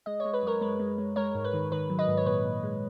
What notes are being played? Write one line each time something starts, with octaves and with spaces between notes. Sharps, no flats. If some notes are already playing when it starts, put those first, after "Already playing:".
G#3 D#5
C#5
G#3
B4
F#2 A#4 C#5
G#3 B4
G#3
G#3
G#3 A#4 C#5
G#2
B4
D#3
D#3 B4
F#3
B4 D#5
G#2
C#5
A#2 B4
A#2
G#3